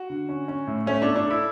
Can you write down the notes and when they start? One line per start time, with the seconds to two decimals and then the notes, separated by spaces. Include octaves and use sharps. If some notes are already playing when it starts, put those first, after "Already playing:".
Already playing: F#4
0.10 D3
0.29 C#4
0.48 C#4
0.67 A2
0.86 A3 C#4
1.02 D4 A4
1.16 D4
1.26 E4 A4